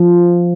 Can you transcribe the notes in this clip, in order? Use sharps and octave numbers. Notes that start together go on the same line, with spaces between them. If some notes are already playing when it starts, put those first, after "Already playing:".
Already playing: F3